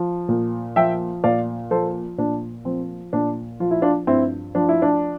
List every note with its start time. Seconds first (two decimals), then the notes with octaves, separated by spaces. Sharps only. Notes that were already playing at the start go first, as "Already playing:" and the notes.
Already playing: F3
0.29 A#2
0.76 F3 E5 G5
1.24 A#2 D5 F5
1.71 F3 A4 C5
2.18 A#2 D4
2.65 F3 C4
3.13 A#2 D4
3.60 F3 F4
3.71 E4
3.82 D4 F4
4.07 G2 C4 E4
4.55 F3 D4
4.69 E4
4.82 D4